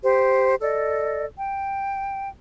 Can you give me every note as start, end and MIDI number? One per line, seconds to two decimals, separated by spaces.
0.03 0.55 67
0.03 0.55 72
0.61 1.25 69
0.61 1.25 74
0.61 1.25 75
1.37 2.29 79